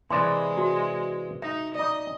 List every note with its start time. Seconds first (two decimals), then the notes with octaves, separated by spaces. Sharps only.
0.10 C3 E3 G#3 D5 A#5 C6
0.57 F#4
1.42 D#4 E5
1.75 D#4 D5 D#5